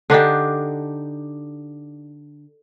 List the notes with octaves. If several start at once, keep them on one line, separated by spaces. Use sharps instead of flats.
D3 D4 D#4 G4